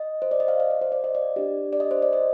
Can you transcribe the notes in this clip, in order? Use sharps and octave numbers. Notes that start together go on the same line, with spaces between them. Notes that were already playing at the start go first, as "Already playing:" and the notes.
Already playing: D#5
C5
D5
D#5
F5
F5
D5
C5
D5
D#5
D5
D4 G4
D5
D#5
C5
D5
D#5